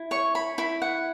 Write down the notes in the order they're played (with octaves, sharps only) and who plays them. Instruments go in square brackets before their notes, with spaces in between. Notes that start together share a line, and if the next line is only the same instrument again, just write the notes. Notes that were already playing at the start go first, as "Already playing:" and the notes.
Already playing: [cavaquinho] E4
C#5 C#6
B5
E4 B5
F#5